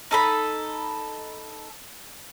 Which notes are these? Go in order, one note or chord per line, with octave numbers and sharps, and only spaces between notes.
D#4 A4 B5